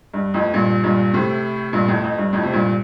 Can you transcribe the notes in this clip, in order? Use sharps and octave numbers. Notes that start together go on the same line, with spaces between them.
G2
F2 A2
G2 A#2
G2 A#2
A2 C3
G2 A#2
F2 A2
F2
G2
F2 A2
C3
G2 A#2